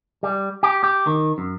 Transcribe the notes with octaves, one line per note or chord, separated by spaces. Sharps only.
G3
G4
G4
D#3
F#2